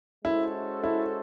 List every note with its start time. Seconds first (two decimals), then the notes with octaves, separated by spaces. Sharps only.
0.25 G#3 C#4 E4 F#4 A4 C5
0.84 E4